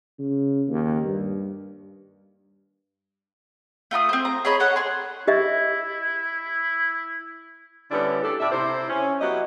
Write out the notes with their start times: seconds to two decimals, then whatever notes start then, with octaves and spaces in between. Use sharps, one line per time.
0.19 C#3
0.68 D#2
1.04 G2
3.91 A3 F4 A#5 D#6
4.09 C4 C5
4.25 A#5
4.45 G#4 C#5 D#5 B5
4.60 A4 C#5 F#5
4.76 G#4 C6
5.28 E4 G4 D#5 E5
7.91 D3 G3 B3 C#4 E4 D5
8.23 A3 D4 G4 A4
8.40 A2 D5 E5
8.52 C3 E4 C5
8.89 C#4
9.20 F#3 B3 E4 F#4 G4 D#5